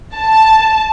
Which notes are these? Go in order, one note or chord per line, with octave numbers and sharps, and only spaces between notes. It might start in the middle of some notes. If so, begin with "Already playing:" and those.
A5